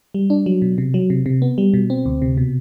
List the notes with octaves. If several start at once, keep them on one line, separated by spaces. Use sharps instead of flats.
G3
D4
F#3
B2
C3
F#3
C3
C3
B3
G3
B2
C4
D2
C3
B2